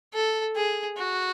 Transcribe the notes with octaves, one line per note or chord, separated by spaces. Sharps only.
A4
G#4
F#4